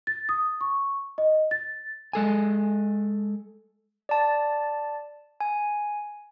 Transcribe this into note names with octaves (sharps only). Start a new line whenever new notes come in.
A6
D#6
C#6
D#5
A6
G#3 A4 G#5
D5 A5
G#5